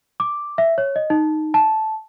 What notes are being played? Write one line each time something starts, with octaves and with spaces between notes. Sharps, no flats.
D6
E5
C#5
D#5
D#4
A5